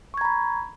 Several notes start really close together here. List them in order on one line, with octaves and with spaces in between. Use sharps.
C#6 G#6 A#5 B5